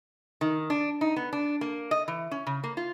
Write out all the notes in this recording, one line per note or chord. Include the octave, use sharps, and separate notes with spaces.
D#3
D4
D#4
B3
D4
A#3
D#5
E3
C#4
C#3
A#3
F4